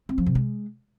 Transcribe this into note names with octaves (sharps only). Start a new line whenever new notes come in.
C4
F3
C3
G#3